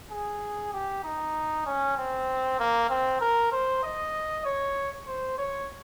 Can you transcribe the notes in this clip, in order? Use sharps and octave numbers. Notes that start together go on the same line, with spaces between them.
G#4
G4
D#4
C#4
C4
A#3
C4
A#4
C5
D#5
C#5
C5
C#5